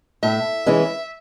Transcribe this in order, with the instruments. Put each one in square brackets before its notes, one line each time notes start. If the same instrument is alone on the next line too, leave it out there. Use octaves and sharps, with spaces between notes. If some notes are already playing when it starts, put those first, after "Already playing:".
[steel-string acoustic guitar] A2 [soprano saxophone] E5
[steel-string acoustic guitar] E3 G#3 C#4